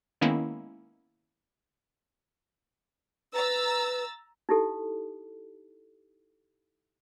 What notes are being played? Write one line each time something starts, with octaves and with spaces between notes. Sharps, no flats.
D#3 G#3 A#3 B3 C#4 E4
B4 A#5 E6 A6
D#4 E4 G4 A4